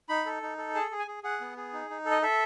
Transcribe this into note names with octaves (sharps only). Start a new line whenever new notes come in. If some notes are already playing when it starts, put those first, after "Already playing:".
D#4 B5
A4
D#4
A4
G#4 A5
G#4
G#5
G#4
G#4 F#5
B3
G#4
D#4
D#4
A4
D#5
A4 E5